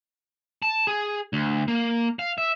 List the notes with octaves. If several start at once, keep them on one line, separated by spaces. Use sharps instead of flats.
A5
G#4
D2
A#3
F5
E5